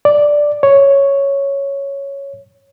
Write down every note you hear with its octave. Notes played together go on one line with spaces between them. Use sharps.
D5
C#5